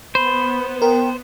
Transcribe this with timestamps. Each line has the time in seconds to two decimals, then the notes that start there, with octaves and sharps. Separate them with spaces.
0.15 B3 C5 B5
0.82 A#4 G5